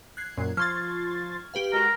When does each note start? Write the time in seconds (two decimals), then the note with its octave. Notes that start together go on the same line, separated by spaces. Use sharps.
0.17 F#6 G#6 C7
0.37 F#2 A#2
0.57 F3 C6 C#6 F6 G#6 A6
1.54 G4 B4 F5
1.73 G#3 F#4 A#4